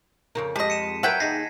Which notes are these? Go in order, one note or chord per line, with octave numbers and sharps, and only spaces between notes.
F2 C#3 A#4
F2 G#3 G4 D#5 A5 B6
C#7 D#7 E7
F#3 A#4 B4 E5 F#5 G5 G#6 B6
D#2 D#4 G#4 A#6 C7